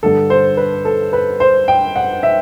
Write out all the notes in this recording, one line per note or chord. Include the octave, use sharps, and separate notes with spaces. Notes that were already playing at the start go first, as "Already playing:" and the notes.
G2 D3 A4
C5
B4
A4
B4
C5
G5
F#5
E5